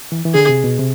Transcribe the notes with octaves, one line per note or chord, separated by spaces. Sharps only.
E3
E3
D3 G#4
C3
B2
C3